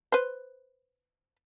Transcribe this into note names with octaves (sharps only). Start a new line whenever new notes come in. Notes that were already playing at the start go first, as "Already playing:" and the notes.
B4 C5